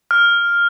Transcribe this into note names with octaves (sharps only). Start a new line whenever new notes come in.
F6